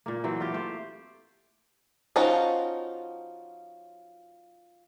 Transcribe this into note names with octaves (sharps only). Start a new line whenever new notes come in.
A#2 A#3
E3 F#3 C4
F4 G4
A3 C5
F3 C#4 D#4 F4 F#4